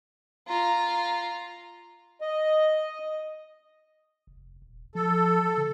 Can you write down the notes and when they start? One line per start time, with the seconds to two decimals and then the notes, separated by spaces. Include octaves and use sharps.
0.47 F4 A#5
2.21 D#5
4.27 F1
4.62 D#1
4.95 F3 A4
5.57 D3